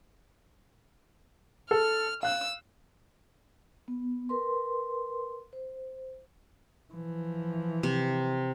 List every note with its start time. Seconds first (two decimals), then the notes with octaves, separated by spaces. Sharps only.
1.71 A4 F6
2.23 F5 E6 F#6
3.88 B3
4.29 A#4 B4 C6
5.53 C5
6.93 E3 F3
7.83 C3